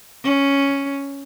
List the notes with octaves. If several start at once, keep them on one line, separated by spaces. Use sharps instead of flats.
C#4